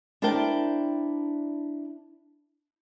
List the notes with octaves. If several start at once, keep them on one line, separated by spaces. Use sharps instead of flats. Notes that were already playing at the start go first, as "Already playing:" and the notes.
D4 E4 A#4 C5 G5 A5